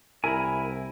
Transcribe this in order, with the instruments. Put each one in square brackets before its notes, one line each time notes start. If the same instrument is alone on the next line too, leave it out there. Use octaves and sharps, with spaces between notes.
[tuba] C2 [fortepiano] E4 A#4 [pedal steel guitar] G#5 B5